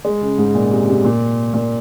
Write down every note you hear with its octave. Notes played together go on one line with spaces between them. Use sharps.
G#3
C#3
G#2
A#2
C3
C3
A#2
A#2